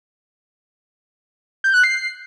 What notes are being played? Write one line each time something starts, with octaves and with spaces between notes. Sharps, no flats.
G6
F#6
C7